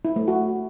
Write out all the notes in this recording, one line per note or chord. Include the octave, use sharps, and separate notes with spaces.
E4
A3
F#4